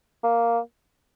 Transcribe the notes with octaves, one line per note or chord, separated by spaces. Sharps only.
A#3